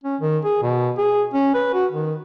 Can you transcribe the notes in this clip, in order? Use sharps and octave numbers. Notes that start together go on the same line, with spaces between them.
C#4
D#3
G#4
B2
G#4
C#4
B4
F#4
D#3